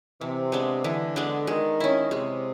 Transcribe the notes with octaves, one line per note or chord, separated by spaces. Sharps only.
C3 E3
G#3 B3 D4
D3 E3
G#3 B3 D4
D#3 G#3
C#4 E4
C3 G#3